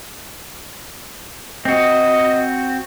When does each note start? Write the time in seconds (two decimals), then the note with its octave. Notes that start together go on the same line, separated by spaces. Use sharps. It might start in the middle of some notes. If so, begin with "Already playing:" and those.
1.65 C4 F#4 D#5